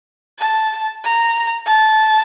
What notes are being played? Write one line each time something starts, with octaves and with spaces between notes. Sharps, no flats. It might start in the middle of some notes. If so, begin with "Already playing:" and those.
A5
A#5
A5